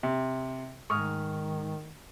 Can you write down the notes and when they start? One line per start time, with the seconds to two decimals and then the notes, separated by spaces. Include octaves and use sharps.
0.03 C3
0.90 G#2 D#3 C#6 D#6 F6